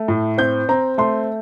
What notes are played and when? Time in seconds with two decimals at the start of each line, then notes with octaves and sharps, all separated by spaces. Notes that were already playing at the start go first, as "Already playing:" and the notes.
Already playing: A3
0.08 A2
0.38 C4 G6
0.69 C4 A#5
0.98 A3 C6